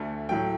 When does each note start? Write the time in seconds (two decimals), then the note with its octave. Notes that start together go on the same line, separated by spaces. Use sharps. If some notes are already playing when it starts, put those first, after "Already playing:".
Already playing: D2 D3 A3
0.29 A2 F#3 A3 G5